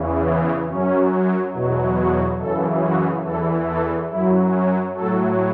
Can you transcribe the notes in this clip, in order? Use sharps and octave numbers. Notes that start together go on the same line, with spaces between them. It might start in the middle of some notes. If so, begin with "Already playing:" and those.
Already playing: E2 C#3 E3
B3
F#2 F#3 C#4
E2 B2 F#3
F#4
F#2 C#3 E3 A4
F#4
E2 E3 A4
A4
F#2 F#3 E4
C#4
A2 F#3 A4